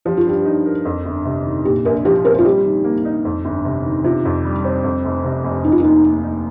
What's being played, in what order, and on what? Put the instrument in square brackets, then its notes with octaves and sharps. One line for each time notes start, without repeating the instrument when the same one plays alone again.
[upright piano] F3 [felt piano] G4
[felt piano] F4
[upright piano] G2 [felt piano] G4
[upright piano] D#4
A#4
F2
G1
C3
D#3
[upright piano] A#2 [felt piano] G4
[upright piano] A#1 [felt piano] A#4
[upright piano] F3 [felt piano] G4
[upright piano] C4 [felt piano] A#4
[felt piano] F4
[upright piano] G3 [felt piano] G4
[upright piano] D#3
A#3
D#4
F2
G1
C3
D#3
[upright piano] C3 [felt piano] F4
[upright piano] F2
G3
C4
F2
F1
C3
F1
[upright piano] D#3 [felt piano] D#4
[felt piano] F4
[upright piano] D#2 [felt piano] D#4
[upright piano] A#3
D#4